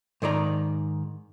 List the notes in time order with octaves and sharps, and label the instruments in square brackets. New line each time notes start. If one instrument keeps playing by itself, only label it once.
[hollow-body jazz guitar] G#2 D#3 D5 A#5